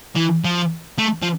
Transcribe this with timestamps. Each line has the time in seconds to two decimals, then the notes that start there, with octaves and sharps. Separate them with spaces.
0.16 E3
0.45 F3
0.98 A3
1.23 F3